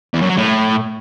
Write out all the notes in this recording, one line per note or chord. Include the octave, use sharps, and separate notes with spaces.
E2
F#2
F#3
A2